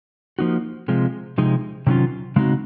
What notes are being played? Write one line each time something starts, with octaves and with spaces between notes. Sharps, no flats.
F3 A#3 D#4 F#4
C3 F3 G#3
C3 F3 G#3 D#4
C3 D#3 F#3 C#4 F4
C#3 G#3 C4 D#4 F#4